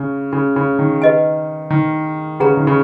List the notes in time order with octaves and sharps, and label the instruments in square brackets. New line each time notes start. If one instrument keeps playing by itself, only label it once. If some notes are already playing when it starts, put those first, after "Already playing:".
Already playing: [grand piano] C#3
C#3
C#3
D#3
[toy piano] B4 D#5 G#5
[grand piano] D#3
[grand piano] C#3 [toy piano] G#4 B4 F#5 A#5
[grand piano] D#3
C#3